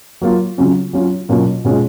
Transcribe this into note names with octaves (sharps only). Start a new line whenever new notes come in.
F#3 A#3 F4
C#3 F#3 C#4 F4
F#3 C#4 F4
B2 F#3 A#3 C#4 F4
B2 G#3 C#4 F4